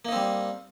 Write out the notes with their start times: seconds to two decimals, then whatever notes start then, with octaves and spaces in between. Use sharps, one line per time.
0.05 A#3
0.08 D#4
0.12 C4
0.16 G3